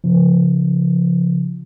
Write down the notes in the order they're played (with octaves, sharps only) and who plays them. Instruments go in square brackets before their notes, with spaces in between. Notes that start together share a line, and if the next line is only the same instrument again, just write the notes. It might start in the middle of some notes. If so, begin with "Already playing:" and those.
[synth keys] C#3 F3